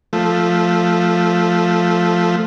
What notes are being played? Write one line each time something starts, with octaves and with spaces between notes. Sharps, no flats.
F3 A3